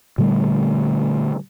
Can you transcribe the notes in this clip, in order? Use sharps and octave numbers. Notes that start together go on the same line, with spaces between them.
A#2 D3 G3 A3